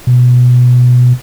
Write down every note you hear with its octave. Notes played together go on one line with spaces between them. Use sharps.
B2